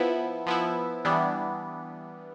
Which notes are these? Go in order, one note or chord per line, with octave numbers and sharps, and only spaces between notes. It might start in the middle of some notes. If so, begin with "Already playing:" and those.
Already playing: F3 B3 E4
F3 B3 E4
E3 G3 B3 D4